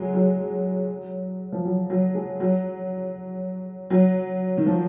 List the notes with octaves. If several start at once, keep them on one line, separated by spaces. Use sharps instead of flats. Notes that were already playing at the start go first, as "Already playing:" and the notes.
Already playing: F#3 G#3
F#3
F3
F#3
F#3
G#3
F#3
F#3
D#3
F3